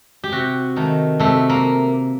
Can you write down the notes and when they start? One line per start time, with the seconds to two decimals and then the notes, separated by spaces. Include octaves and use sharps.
0.24 G4
0.32 C3 F#4
0.76 D#3 A3
1.19 C3 A3
1.49 A#3